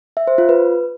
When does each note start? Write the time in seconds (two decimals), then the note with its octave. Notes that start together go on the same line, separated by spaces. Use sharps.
0.17 E5
0.27 C5
0.38 F4
0.49 B4